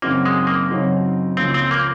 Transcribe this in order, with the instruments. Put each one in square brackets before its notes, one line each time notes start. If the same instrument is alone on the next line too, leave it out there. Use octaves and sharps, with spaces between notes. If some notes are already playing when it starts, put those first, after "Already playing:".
[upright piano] F#2 C#3 F#3 C4 D#4 [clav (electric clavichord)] A#3
[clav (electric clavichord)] G#3
A#3
[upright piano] F#2 C#3 F#3 C4 D#4
[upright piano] C#2 C#3 F3 A#3 [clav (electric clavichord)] C4
[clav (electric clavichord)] C4
A#3